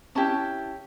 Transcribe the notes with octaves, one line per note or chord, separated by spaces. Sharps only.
C#4 E4 G4 A5